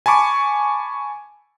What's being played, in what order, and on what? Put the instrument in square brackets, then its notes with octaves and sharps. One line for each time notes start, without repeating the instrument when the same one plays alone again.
[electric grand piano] G#5 A5 B5 C#6 D6